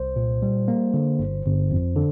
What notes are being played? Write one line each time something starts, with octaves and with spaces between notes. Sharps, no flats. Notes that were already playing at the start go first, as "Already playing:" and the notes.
Already playing: C2 C5
A#2
G3
A#3
D3
G1
G1
F2
D3